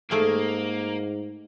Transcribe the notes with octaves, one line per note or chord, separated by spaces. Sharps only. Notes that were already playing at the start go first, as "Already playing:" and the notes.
G#2 A3 A#3 G#4 F5